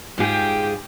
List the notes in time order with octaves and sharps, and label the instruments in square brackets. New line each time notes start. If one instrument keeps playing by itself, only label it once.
[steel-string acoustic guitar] G#2 F4 G#4 [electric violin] G4 G5